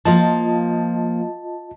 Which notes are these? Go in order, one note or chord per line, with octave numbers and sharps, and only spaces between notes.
F3 A#3 F4 D#5 A5